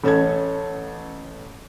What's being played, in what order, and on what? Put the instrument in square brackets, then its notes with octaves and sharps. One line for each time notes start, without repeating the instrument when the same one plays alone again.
[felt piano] A1 C#4 A4 A5 G#6